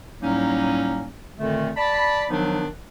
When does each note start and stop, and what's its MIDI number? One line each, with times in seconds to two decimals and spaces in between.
0.21 1.06 45
0.21 1.06 54
0.21 1.06 55
0.21 1.06 58
0.21 1.06 61
0.21 1.06 63
1.39 1.70 41
1.39 1.70 46
1.39 1.70 50
1.39 1.70 51
1.39 1.70 57
1.77 2.25 74
1.77 2.25 81
1.77 2.25 83
2.30 2.65 51
2.30 2.65 53
2.30 2.65 54
2.30 2.65 59
2.30 2.65 62
2.30 2.65 63